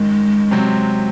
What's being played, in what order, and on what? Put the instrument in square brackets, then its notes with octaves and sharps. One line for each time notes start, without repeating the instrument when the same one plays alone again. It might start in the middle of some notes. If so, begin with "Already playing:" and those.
Already playing: [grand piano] F#2 D#3 [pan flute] G#3
[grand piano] C3 F#3 C4